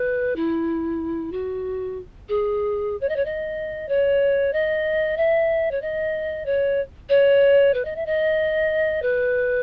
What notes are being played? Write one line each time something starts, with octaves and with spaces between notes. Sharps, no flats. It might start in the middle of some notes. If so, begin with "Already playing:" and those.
Already playing: B4
E4
F#4
G#4
C#5
D#5
C#5
D#5
C#5
D#5
E5
C#5
D#5
C#5
C#5
B4
D#5
E5
D#5
B4